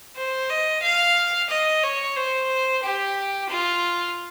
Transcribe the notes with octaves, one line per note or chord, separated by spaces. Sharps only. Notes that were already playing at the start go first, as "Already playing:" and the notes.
C5
D#5
F5
D#5
C#5
C5
G4
F4